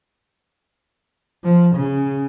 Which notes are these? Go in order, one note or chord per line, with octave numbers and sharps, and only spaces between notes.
F3
C#3